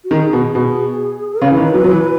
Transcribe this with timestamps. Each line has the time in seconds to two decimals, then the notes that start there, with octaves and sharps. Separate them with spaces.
0.04 F#4
0.11 D#3 G#4
0.33 B2
0.55 B2
1.41 C#3 B4
1.50 E3
1.58 D#3
1.74 F#3
1.84 F#3
1.91 E3